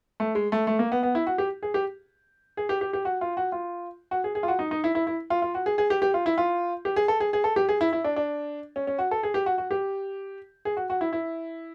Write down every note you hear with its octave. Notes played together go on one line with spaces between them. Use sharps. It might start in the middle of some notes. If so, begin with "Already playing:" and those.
A3
G#3
A3
A3
A#3
B3
B3
E4
F#4
G4
G#4
G4
G#4
G4
G4
G4
F#4
F4
F#4
F4
F#4
G#4
G#4
F4
F#4
D#4
D#4
E4
E4
E4
F4
F4
F#4
G#4
G#4
G4
G4
F4
E4
F4
G4
G#4
A4
G#4
G#4
A4
G4
G#4
E4
E4
D4
D4
C#4
C#4
F#4
A4
G#4
G4
F#4
F#4
G4
G#4
F#4
F#4
E4
E4